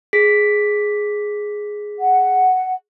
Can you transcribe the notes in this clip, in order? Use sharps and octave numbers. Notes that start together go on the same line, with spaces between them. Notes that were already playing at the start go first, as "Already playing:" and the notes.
G#4 B6
F#5